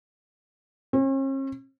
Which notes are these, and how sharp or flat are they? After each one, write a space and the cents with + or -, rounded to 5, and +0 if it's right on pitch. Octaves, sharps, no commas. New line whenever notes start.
C#4 -45